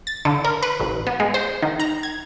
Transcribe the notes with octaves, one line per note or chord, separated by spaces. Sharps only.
A6
D3
A#4
B4
A1
B3
G#3
C5
D#3
A#5
G#6